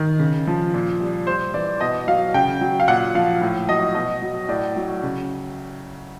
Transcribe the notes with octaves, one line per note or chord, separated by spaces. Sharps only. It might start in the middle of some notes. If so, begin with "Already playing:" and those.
Already playing: D#3
C#3
F3
A#2
G3
G3 C5
E3 D5
B2 D#5
F#3 F5
C#3 G5
F#3
F5
A#2 F#5
F3 F5
A2
F#3 D#5
B2 D#5
F#3
A2 D5
F#3
C#3